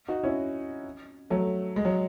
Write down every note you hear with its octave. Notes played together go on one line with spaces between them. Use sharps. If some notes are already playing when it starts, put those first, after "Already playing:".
D#4 F#4
C#4 E4
F#3 A3
G#3
F#3